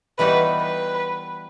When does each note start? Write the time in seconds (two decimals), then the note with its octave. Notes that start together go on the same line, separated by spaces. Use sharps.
0.19 E3 G3 B3 D#4 F#4 B4
0.61 B4